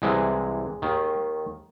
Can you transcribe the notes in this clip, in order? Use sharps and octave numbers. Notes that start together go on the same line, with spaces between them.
C2 C3 E3 G#3
D#2 D#3